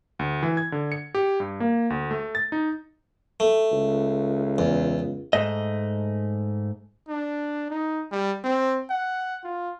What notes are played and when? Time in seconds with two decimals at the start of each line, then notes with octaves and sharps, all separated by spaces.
0.19 D2
0.43 E3
0.57 G#6
0.72 D3
0.92 C#7
1.15 G4
1.40 G2
1.60 A#3
1.90 D2
2.11 A3
2.35 A6
2.52 D#4
3.40 A3
3.72 C#2
4.58 E2
5.33 G#2 A3 D#5
7.08 D4
7.70 D#4
8.11 G3
8.44 C4
8.90 F#5
9.44 F4